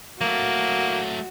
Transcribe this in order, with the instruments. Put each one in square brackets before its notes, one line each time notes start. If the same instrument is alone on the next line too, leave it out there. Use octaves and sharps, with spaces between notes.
[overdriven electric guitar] F#3 A3 [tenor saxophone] A#3 [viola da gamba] F#4